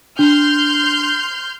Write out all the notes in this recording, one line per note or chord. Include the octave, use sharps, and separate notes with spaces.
D4 C6 F6 G6